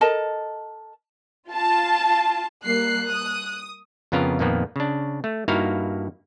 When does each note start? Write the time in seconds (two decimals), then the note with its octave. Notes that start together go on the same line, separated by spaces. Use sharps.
0.01 A4 A#4 D#5 A5
1.50 F4 A5
2.65 G3 A#3 F#6 C7
3.11 D#6
4.12 F2 C#3 B3 F4 A#4
4.39 F2 A#2 D#3 F3 A#3 B3
4.76 C#3 D4
5.24 A3
5.48 G2 A#3 D#4 E4 F#4 F5